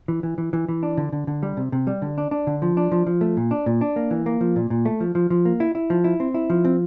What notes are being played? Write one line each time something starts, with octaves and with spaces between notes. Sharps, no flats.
E3
E3
E3
E3
E3
D4
D3
D3
D3
G3
C3
C3
G3
D3
D4
D4
D3
F3
D4
F3
F3
A3
A#2
D4
A#2
D4
A#3
E3
A#3
F3
A#2
A#2
A3
F3
F3
F3
A#3
E4
E4
F3
E4
C4
E4
F3
C4